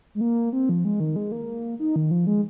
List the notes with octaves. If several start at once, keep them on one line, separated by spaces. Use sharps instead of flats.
G#3
A#3
C4
F3
G#3
D#3
G#3
A#3
D#4
D#3
F3
G#3